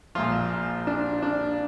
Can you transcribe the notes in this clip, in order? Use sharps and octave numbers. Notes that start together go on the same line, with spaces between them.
A#1 A#2 F3 F4
D4
D4